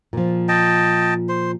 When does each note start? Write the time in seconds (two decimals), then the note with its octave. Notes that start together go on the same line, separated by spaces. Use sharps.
0.13 A#2 F3
0.49 D#5 G5 A5
1.29 C5